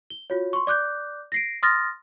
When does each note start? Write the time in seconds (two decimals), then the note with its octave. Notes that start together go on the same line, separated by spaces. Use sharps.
0.10 G7
0.30 F4 F#4 C#5
0.53 C6 C#6
0.67 D5 D6 F#6 G6
1.32 A#6 C7 D7
1.63 C6 D#6 F6 A6 A#6